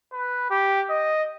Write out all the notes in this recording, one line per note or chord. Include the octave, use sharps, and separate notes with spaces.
B4
G4
D#5